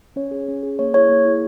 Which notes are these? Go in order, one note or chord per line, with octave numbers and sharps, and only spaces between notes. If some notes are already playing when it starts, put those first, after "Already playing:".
C#4 C#5
G#4
C#4
G#4
A#3 C#5
E4 G#4 C#5
A#3
E4 G#4